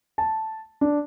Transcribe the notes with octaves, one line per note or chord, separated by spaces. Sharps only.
A5
D4